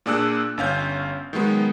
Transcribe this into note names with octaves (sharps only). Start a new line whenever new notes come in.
A#2 A#3 D4 G#4 E6 F#6
G1 C#4 F5 G6
D#3 F#3 G#3 B3